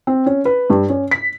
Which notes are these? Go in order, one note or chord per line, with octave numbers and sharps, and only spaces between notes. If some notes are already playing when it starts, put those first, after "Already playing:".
C4
C#4
B4
G2
C#4
B6